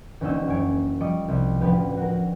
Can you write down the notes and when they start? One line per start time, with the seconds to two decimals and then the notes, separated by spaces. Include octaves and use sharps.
0.21 E1 D2 A#3 C#4 D#4 E6
0.48 F#1 C#5 G#5 D7
1.01 F3 G3 D#5 C#6 D6 D7
1.28 C2
1.61 A1 D2 F3 B3 G4 B4
1.97 F#4 A#4